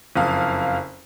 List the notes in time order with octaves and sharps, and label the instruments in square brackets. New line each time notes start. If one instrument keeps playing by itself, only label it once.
[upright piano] F#1 F2 F5